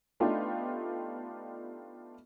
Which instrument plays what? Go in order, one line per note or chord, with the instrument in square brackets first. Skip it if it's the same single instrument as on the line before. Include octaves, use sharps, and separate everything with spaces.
[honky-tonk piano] A3 B3 D4 D#4 F4 G4